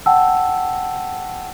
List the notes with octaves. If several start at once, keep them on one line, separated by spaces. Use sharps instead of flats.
F#5 G5 A5 E6